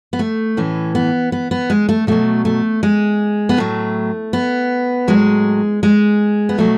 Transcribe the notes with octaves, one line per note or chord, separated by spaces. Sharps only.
B3
A3
A2 E3 C#4
B3
B3
B3
G#3
A3
B2 F#3 A3
A3
G#3
B3
A2 F#3 A3
B3
A2 F#3 G#3
G#3
B3
B2 F#3 A3